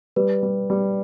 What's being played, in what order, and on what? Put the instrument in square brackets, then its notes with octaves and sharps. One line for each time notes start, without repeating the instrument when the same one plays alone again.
[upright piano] G3 [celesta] B4
[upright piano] G3
G3